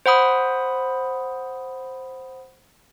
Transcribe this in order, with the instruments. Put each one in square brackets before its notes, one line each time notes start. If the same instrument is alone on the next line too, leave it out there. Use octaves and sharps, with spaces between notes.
[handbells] C5 F#5 B5 D#6